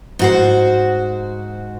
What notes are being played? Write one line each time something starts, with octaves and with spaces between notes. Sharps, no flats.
G#2 F#4 C5